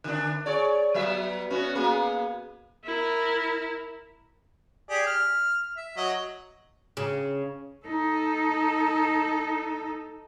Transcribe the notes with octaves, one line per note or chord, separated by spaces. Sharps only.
D3 D4
G#4 C#5 D5
F#3 B3 E5
B3 C#4 F#4
A#3 B3 G#4
E4 A#4
G4 G#4 D5
F6
E5
F#3 D#5
C#3
D#4 A4